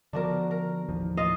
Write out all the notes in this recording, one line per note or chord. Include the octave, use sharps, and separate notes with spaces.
D3 F3 B3 D4 F#4 A#4
A#4
A1 D#2 F3
F4 D#5 F5